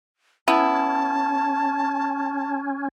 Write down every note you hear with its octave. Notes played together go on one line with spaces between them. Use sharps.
B3 C#4 E4 A5